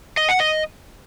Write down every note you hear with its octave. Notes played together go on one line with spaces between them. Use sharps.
D#5
F#5
D#5